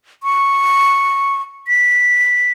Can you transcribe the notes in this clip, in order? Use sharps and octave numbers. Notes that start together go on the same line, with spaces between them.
C#6
B6